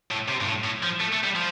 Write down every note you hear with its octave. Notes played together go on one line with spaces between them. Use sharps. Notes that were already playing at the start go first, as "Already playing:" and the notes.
A2
C3
G2
A2
A2
F3
A3
A3
G3
F3